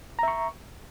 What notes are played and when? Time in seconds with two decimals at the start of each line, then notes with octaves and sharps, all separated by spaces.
0.19 A#5
0.23 E5
0.28 C#6